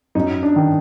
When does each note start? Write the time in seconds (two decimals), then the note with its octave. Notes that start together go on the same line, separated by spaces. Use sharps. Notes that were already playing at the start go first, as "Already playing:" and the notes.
0.15 F#2 D#4
0.43 D4
0.56 D#3